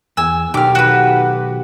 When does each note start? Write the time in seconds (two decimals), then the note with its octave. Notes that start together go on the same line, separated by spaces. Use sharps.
0.17 E2 G#5 E6
0.54 B1 D#3 G4 D6 F6
0.75 F#4 B4